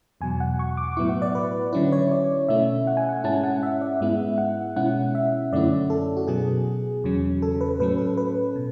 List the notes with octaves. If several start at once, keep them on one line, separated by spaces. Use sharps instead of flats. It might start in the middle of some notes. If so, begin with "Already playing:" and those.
E2 B2 F#3 G#5
F#5
C#6
D6
A2 F#3 B3 E4 C#6
F#5
D5
B4
D3 F#3 C#4 E4 B4
C#5
D5
B2 A3 C#4 E4 E5
F#5
G#5
F#5
G#2 G#3 C#4 E4 A5
F#5
E5
D5
G#2 G#3 B3 E4 E5
F#5
B2 G#3 C#4 E4 F#5
E5
F#2 D3 A3 C#4 E4 D5
A4
F#4
B2 F#3 B3 G#4
E2 C#3 F#3 C#4
A4
B4
A2 F#3 C#4 B4
A4
B4
B2